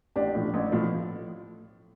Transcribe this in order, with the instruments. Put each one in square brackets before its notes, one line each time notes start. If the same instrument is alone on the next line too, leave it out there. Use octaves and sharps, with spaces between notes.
[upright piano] A1 D4 G4
A2 F3
A1
A2 F3